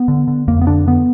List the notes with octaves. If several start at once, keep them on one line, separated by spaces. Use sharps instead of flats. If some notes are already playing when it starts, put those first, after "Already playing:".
Already playing: B3
D3
D3
F2 A#3
B3
D3 D4
D3 B3